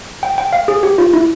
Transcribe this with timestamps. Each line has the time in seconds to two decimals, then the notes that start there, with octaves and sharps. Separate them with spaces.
0.23 G5
0.38 G5
0.53 F5
0.68 G#4
0.83 G4
0.98 F4
1.13 E4